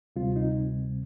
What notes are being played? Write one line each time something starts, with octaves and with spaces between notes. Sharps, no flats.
D2 C3 G3 C4 F4
D#4